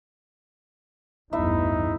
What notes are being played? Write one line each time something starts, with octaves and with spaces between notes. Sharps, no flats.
A1 E2 G2 D#4 E4 E5